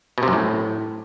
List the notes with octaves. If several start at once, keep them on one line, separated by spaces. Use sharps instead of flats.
B2
C3
F#2
A2